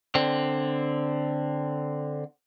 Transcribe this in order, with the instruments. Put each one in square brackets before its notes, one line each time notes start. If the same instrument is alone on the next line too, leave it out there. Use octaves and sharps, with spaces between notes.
[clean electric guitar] D3 C4